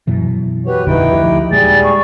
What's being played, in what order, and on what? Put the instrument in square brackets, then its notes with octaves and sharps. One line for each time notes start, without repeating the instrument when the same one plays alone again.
[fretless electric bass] F#2 B2 E3
[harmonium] F#4 G4 C#5 [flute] B4
[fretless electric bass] A#1 F2 D3 [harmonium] D#4 E4 G5 [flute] B4
[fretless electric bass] D2 F3 [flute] G4
[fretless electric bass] D#1 G#3 [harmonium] G3 G#4 [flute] A6
[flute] C#6